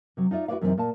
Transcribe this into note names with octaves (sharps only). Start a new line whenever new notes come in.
C3 F#3
D#4 F4 D5 E5
E4 F#4 B4 C#5 D5 F5
F#2 C3 E3 G#3 C4 D#4
A#2 F5 A5